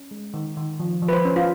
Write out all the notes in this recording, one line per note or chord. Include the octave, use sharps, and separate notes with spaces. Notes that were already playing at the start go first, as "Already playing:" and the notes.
Already playing: C#4
G#3
D#3
D#3
F3
F3
B4
C5
C#4
F4